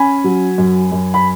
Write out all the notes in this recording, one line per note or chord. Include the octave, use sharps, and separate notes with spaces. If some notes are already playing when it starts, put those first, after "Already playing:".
Already playing: C#4 G#5 B5
F#3
F#2
F#2
B5